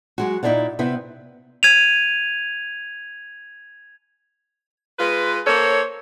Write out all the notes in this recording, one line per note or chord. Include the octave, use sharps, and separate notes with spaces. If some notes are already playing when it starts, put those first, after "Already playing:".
F#3 G#3 F#4
A#2 D#4 E4 G#4 D5 F#5
C3 B3 E4
G#6 D#7 F7
G#3 F4 B4
A#3 A4 C5 C#5